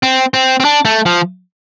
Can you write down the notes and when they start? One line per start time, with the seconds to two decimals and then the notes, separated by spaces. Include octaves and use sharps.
0.03 C4
0.34 C4
0.60 C4
0.65 D4
0.85 A3
1.06 F3